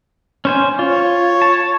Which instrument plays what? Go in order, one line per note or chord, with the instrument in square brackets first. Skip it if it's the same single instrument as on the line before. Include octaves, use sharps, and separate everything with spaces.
[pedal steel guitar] C#4 C5 G#5
[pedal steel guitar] F4 [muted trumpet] C#5
[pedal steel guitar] A5